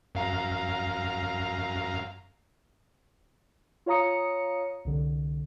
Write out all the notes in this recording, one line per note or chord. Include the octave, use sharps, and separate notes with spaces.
F#2 F5 A#5
F4 C#5 F5 A#5 D#6 C#7
C2 D3